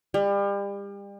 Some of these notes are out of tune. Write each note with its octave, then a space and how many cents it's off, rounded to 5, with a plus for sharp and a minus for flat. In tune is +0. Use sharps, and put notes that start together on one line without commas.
G3 +35